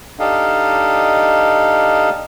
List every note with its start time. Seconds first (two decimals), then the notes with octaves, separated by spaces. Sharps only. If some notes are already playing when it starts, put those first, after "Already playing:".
0.19 D4 D#4 G4 A4 D#5 F5